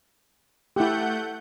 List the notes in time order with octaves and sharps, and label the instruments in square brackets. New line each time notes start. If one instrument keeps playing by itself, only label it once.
[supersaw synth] A3 F#5 G6 [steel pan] E4 G4